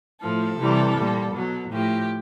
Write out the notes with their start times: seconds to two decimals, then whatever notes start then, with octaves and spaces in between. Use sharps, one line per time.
0.21 A2 F3 A4
0.58 C3 E3 G3
0.96 A#2 G3
1.33 B2 F#3
1.71 A2 F3 G4